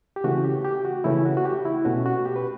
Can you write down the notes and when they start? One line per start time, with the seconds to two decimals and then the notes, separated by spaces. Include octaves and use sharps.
0.16 G4
0.24 C#3 E3 A3 C#4 F#4
0.44 G4
0.65 G4
0.85 F#4
1.04 C#3 E3 A3 C#4 E4
1.25 F#4
1.37 F#4
1.45 G4
1.65 E4
1.85 B2 A3 C#4 F#4
2.06 F#4
2.25 G4
2.36 B4